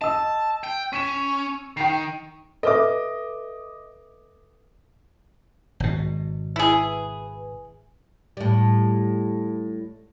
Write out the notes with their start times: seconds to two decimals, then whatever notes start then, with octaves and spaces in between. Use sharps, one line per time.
0.01 D#5 A5 E6
0.64 G5
0.93 C#4 B6 D#7 E7
1.77 D#3 G5 C7
2.63 A4 B4 D#5 E5 D6
5.80 G#1 B2
6.56 E4 G#4 B4
8.37 A2 G3